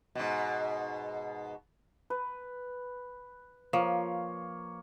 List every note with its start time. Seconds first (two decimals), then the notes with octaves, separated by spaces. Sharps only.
0.15 G#2 B2
2.10 B4
3.73 F3 A#3 C#5